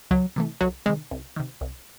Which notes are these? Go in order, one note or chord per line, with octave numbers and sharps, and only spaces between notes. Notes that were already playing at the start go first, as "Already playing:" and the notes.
C#2 F#3
C3 E3 A3
C2 F#3
C3 D#3 G#3
C2
C3 D#3
C2